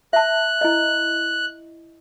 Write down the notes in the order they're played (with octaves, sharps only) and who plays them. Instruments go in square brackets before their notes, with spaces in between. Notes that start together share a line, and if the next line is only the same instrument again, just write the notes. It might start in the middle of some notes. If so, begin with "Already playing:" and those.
[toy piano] E5 A5 [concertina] F#6
[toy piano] E4 D#5